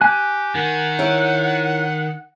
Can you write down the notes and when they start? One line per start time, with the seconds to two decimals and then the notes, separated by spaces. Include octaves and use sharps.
0.01 G4 G#5 F#6
0.55 D#3 F#5
0.99 E4 A#4 C#5